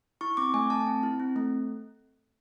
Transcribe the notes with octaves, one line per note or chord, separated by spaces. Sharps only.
E4 C#6
C4 D6
A3 G#5
A3 A5
C4
E4
C4
A3